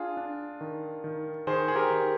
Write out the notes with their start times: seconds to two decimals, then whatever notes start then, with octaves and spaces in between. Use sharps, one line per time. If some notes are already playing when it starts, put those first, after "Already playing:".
Already playing: D4 F4 G#4
0.17 D4
0.61 D#3
1.04 D#3
1.47 D#3 G#4 C5
1.68 G#4
1.76 G4 A#4
1.90 D#3